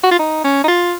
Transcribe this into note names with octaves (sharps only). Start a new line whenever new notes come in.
F#4
F4
D#4
C#4
D#4
F4